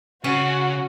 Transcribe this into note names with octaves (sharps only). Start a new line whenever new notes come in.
C#3 C#4 F#4